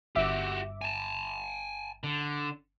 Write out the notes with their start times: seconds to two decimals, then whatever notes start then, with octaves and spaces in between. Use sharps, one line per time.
0.16 G1 F#4 G4 E5 D6
0.82 G#5 A5
2.04 D3